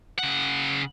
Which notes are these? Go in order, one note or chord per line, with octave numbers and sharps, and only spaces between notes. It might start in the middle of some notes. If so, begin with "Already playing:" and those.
C#3 F#5